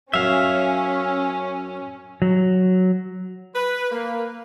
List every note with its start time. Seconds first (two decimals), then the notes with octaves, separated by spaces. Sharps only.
0.14 F#2 C#4 E5 F5
2.22 F#3
3.54 B4
3.91 A#3